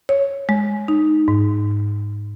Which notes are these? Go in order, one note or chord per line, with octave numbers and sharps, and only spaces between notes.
C#5
G#3
D#4
G#2